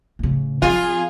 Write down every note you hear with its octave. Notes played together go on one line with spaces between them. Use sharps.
A2 C#3
F3 C4 F4 G#4